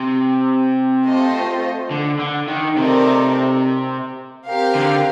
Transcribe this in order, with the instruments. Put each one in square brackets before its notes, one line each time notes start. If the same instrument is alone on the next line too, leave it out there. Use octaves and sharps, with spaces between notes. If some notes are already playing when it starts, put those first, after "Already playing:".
Already playing: [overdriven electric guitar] C3
[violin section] A3 C4 F4 C5 D#5
[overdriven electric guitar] D3
D3
D#3
[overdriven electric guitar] C3 [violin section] A3 C4 D#4 A#4 D5
[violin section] C4 G4 A#4 F5
[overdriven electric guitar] D3